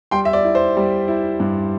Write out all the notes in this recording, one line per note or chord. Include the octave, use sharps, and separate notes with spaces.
G3 G5 C6
E5
D5
E4
C5
G3
E4
G2